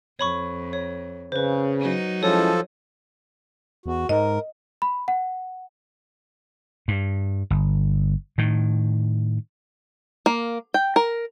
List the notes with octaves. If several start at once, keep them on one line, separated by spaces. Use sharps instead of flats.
F2 C#5 B5 C#6
C#5
C#3 B4 C5
F#3 D#4
F3 G#3 C#4 E4 A4 C#5
E2 F#4
G#2 A#4 D#5
B5
F#5
G2
G1
A2 D#3
A#3
G5
A#4